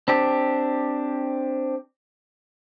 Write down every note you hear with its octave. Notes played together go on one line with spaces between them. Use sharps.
C4 D4 G4